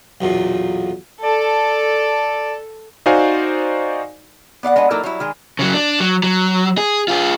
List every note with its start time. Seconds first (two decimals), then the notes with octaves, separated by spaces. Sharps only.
0.21 B1 E2 A#2
1.23 A4 D5
3.06 D#4 F#4 C5 D5 F5 G#5
4.63 B3 D5 F5 F#5
4.76 G#3 B3 D4 D#5 F#5
4.91 F#3 A#3 D#4 E4 A4 A#4
5.03 F#3 G3 E4
5.20 D#3 G#3 G#4
5.59 C#3 F#3
5.74 D4
6.00 F#3
6.23 F#3
6.78 G#4
7.08 F4 G#4